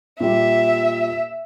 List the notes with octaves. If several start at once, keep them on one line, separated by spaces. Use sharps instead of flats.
A#2 G3 E5